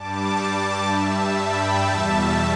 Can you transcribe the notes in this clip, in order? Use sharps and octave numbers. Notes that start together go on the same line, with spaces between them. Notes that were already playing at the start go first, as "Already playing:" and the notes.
Already playing: G2 G3 A5 D6
G2 G3 E5 A5
G5 B5
E2 B2 G3 E5 A5